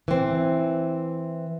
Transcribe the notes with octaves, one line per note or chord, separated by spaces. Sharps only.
E3 C4